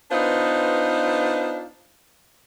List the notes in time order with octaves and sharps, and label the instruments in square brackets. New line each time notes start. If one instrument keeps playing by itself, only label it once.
[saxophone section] B3 D4 D#4 F4 B4 C5